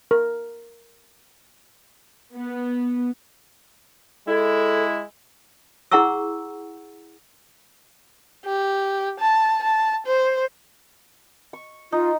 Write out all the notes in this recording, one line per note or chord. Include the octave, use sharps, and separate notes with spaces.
A#4
B3
G#3 E4 A4
E4 G#4 F#5 A#5 C#6 E6
G4
A5
A5
C5
C#6
D#4 F4